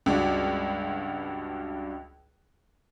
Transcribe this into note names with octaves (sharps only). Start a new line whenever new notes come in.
C#2 G2 D4 F#4